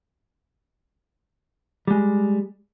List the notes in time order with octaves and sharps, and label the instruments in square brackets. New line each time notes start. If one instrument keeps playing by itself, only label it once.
[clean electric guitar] G3 G#3